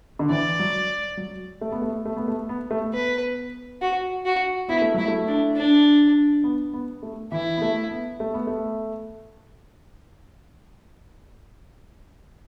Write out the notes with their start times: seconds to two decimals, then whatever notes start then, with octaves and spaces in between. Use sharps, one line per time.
0.19 D3
0.29 E3 D5
0.59 F#3
1.17 F#3
1.61 A3
1.72 B3
1.82 A3
2.06 A3
2.17 B3
2.28 A3
2.49 B3
2.71 A3
2.93 B3 B4
3.81 F#4
4.25 F#4
4.68 B3 E4
4.82 A3
4.94 F#3 E4
5.08 A3
5.27 D4
5.56 D4
6.44 B3
6.74 B3
7.03 A3
7.32 E3 E4
7.57 B3
7.62 A3
7.91 B3
8.20 A3
8.34 B3
8.47 A3